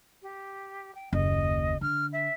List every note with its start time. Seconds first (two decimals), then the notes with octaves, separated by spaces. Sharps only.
0.22 G4
0.94 G5
1.13 F#1 D#2 D#5
1.81 D3 F6
2.12 E5